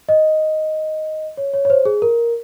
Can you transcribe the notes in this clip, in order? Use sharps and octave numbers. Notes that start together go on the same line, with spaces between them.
D#5
C#5
C#5
C#5
C5
G#4
A#4